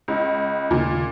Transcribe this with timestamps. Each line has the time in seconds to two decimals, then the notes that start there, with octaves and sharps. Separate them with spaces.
0.08 C#2
0.71 D#2 A#2 C#3